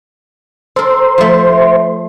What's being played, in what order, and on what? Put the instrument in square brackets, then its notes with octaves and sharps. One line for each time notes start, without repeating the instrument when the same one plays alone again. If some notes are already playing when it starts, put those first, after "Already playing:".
[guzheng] A4 A#4 [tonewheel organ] C5
[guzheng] F3 A3